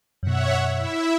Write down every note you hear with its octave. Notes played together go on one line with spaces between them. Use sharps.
F#2 B2 C#5 E5 F#5
E4 E5